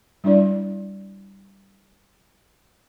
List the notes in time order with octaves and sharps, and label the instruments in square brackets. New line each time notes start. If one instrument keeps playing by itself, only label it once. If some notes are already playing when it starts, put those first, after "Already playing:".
[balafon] G3 D4 E4 D5